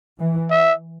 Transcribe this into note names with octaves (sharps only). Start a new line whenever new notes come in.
E3
E5